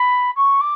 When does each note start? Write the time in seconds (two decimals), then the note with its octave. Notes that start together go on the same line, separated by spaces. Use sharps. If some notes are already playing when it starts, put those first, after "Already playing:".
Already playing: B5
0.36 C#6
0.61 D6